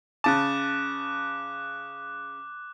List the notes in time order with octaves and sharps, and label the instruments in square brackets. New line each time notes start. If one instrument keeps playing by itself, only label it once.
[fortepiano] C#3 A5 [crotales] D6 F#6